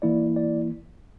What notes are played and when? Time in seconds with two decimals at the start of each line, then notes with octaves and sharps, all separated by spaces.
0.02 E3 A#3 E4 D5
0.36 D5